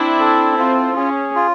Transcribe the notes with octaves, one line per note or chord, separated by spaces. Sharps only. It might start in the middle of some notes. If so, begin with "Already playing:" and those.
Already playing: C4 D4 E4
A4
C4 F4
C#4 G#4
F4